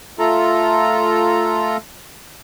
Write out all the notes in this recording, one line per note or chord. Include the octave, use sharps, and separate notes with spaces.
A3 F4 A4 A#5